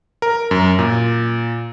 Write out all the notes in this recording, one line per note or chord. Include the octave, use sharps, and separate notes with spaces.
A#4
F#2
A#2